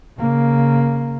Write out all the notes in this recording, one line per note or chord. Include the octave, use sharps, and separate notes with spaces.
C#3 A#3